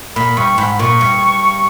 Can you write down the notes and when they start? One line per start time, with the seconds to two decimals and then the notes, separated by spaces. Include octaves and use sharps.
0.16 A#2 B5
0.37 G2 C#6
0.58 G#2 B5
0.79 A#2 C#6
1.01 G2